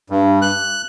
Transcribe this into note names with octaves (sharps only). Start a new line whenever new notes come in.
G2
F#6